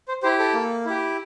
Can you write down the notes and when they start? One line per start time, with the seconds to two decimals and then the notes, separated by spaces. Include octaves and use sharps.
0.08 C5
0.23 E4 G4 C5
0.39 A4
0.54 A#3
0.85 E4 G4